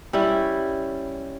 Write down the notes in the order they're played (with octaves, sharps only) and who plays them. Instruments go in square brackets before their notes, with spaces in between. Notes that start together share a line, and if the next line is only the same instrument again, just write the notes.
[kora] G3 C#4 E4